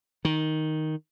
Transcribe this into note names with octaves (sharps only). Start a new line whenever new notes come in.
D#3